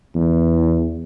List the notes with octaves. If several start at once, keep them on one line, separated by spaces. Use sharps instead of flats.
E2